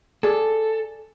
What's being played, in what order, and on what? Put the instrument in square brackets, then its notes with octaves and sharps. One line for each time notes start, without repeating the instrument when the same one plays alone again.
[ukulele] G#4 D5 [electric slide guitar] A4